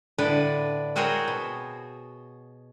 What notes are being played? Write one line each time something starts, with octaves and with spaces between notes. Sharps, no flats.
A2 D3 D4 B4 D5
C4 F#4 G#4 A#4 C5 C#5
B2